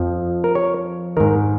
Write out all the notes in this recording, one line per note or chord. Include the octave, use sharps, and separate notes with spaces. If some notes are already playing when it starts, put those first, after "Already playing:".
Already playing: F2 F3
A#4
C#5
G#2 D#3 A#4